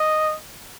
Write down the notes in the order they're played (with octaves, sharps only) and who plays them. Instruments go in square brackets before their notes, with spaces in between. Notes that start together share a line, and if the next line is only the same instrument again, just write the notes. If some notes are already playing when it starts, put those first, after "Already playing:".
Already playing: [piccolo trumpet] D#5